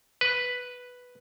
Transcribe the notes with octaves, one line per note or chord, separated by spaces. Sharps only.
B4